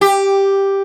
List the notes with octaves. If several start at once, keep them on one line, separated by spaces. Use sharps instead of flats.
G4